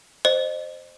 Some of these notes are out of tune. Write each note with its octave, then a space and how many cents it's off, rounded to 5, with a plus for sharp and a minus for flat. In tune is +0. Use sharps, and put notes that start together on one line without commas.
C5 +0 D#5 -30